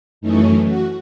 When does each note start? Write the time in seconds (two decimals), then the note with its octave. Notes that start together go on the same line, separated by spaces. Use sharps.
0.21 F#2 E3 A3 C#4 D#4
0.66 F#4